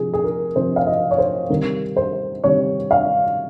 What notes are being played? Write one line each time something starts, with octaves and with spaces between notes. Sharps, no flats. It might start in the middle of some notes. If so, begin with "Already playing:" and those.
Already playing: C3 F3 G#4
G#4
A#4
C3 F3 C5
F5
D#5
C#5
C5
C3 D#3 G3 A#4
C5
C3 D#3 G3 C#5
F5